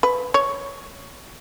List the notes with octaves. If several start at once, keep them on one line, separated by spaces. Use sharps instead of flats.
B4
C#5